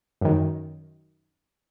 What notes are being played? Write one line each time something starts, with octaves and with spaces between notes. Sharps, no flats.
F#2 D#3